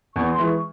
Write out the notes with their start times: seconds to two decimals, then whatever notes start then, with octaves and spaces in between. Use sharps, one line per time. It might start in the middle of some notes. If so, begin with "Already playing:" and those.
0.15 E2 C#6
0.31 C6
0.38 E3 G#3
0.45 C#6